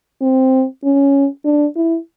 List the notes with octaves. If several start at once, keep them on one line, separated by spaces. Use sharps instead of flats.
C4
C#4
D4
E4